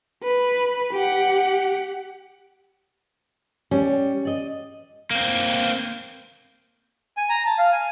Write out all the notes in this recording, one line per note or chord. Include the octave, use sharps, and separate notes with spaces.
B4
G4 F#5
G3 C#4
D5 D#5
A#3 C4
G#5
A#5
A5
F5
G#5